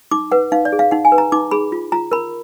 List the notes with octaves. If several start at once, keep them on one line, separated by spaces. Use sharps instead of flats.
D#4 D6
B4 F#5
D#4 F5
D5
G#4
F5
D#4 F#5
G#5
B4
A#5
D#4 D6
G#4 B5
F4
F4 A#5
A#4 B5